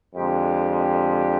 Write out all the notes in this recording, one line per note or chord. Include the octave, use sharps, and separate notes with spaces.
F2 D3 G#3 D4 G4